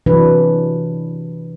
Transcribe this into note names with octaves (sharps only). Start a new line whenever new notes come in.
C3 E3 F#3 D4 B4